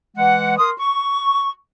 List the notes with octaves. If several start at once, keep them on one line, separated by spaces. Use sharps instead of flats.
E3 G#3 F#5
A#4 C6 D#6
C#6